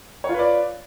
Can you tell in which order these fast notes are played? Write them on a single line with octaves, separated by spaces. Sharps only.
C#5 F4 B4 D5